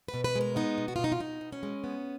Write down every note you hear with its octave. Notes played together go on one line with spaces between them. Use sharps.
B4
B2
B4
G#3
A#4
B3 D#4
B2
F#4
F4
B2
D#4
F4
B2 D#4
B2
C#4
G#3
B3